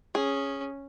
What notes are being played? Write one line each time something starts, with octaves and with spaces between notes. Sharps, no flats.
C#4 G#4